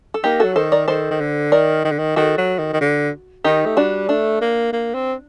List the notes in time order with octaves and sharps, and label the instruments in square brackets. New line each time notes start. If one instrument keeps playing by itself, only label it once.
[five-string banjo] A4
[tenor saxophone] A#3 [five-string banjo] D#4 G4
[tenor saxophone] F#3 [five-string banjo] F#4 A4
[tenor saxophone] D#3 [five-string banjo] A4 C5
[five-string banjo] A#4 D5
[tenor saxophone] D#3 [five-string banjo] A4 C5
[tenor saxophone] D#3
D3
[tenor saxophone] D#3 [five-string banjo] A#4 D5
[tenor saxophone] D#3
D3
D#3
[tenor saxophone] D#3 [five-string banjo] F#4 A4
[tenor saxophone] F#3
D#3
D#3
D3
[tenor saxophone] D#3 [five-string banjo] D#4 G4
[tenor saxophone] A3
[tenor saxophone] G3 [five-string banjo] D4 F#4
[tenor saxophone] A3 [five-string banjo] D4
[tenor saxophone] A#3
A#3
C4